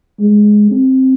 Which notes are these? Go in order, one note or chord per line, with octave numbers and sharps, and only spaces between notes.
G#3
C4